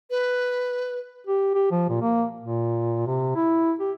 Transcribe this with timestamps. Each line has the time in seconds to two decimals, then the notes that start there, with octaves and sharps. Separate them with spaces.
0.10 B4
1.27 G4
1.54 G4
1.71 F3
1.89 A#2
2.01 A#3
2.40 A#2
3.07 C3
3.35 E4
3.79 G4